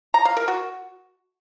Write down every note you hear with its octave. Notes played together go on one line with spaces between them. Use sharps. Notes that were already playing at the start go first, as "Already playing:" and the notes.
A#5
F5
A#4
F#4